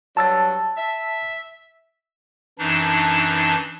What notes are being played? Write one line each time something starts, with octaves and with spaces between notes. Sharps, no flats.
G2 F#3 A5 E6 A6
E5
F#2 E3 D4 D#4 A5